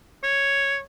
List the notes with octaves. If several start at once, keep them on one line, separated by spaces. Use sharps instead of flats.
C#5